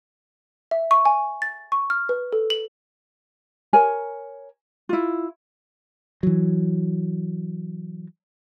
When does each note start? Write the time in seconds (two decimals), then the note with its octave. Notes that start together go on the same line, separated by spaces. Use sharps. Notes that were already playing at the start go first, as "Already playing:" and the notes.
0.71 E5
0.91 C#6
1.05 G#5
1.42 A6
1.72 C#6
1.90 F6
2.09 B4
2.33 A4
2.50 F#7
3.73 A#4 C#5 G#5
4.89 E4 F4
6.23 E3 F#3